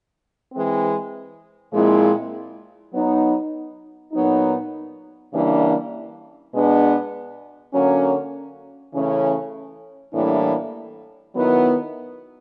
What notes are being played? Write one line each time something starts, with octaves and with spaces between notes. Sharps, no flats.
E3 G#3 C4
A#2 F3 G#3 C4 E4
F#3 B3 D#4
A#2 F#3 B3 D#4
C#3 E3 G3 A#3 D4
B2 G#3 B3 D4
D3 F#3 A#3 C#4
C#3 E3 A3 C#4
A2 E3 G3 A#3 D4
D#3 F#3 B3 E4